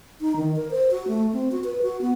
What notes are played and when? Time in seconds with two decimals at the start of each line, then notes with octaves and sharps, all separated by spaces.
0.21 D#4
0.36 D#3
0.56 A#4
0.71 C5
0.91 F#4
1.08 A3
1.33 C4
1.52 F#4
1.64 B4
1.82 F#4
2.02 B3